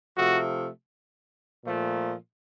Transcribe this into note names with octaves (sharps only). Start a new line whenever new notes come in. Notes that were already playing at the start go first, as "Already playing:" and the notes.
C3 F3 A3 F#4
A#2 F3 A3